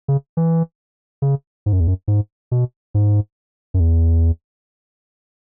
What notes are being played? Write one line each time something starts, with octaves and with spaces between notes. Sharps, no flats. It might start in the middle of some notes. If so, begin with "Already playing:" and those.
C#3
E3
C#3
G#2
F#2
E2
F#2
G#2
B2
G#2
F#2
E2